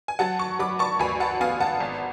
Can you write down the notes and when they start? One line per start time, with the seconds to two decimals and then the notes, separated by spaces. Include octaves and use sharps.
0.08 G#5
0.19 F#3 F#5 A5
0.39 A5 C#6
0.59 F#3 B5 D6
0.79 A5 C#6
0.99 D2 G#5 B5
1.20 F#5 A5
1.41 B3 F5 G#5
1.61 F#5 A5
1.80 G#1